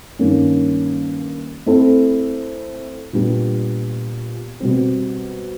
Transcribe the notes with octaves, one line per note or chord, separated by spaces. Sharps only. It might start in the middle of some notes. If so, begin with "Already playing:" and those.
G2 D#3 G3 A#3 C#4
A3 C4 E4 A4
A#2 G3 B3 D4 G4
B2 G3 C4